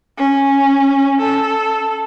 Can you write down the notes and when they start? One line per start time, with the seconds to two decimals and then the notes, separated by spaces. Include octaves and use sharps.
0.18 C#4
1.21 A4